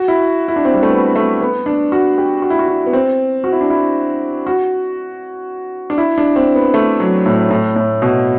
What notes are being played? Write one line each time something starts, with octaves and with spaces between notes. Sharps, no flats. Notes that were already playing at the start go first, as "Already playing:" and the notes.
Already playing: F#4
E4
E4
D4
C4
G3
A3
B3
A3
B3
D4
F#4
G4
F#4
E4
F#4
E4
B3
C4
F#4
E4
D4
E4
F#4
D4
E4
D4
C4
B3
A3
F#3
A2
A2
A2
B2